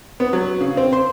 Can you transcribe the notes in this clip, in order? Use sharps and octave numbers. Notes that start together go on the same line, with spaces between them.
B3
F#3
C#3
C4
C5